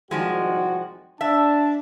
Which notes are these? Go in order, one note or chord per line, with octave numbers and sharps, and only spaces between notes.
C2 G#2 D#3 F3 G#3 F#4
D4 E5 A5